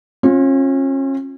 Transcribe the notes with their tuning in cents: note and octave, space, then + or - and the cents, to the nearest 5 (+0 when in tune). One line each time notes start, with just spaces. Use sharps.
C#4 -35 F4 +25